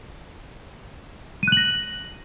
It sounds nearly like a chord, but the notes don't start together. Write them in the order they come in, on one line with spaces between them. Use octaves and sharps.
D#7 F#6 F#7 A#6